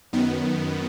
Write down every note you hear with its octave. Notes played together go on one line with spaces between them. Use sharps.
F#2 D#3 B3